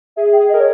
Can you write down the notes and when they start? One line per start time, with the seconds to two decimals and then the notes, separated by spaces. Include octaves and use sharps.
0.17 G#4 E5
0.33 G5
0.39 G#4
0.49 D#5
0.54 A#4
0.59 C#5